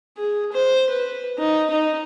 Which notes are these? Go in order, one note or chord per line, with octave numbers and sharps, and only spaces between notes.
G#4
C5
B4
D#4
D#4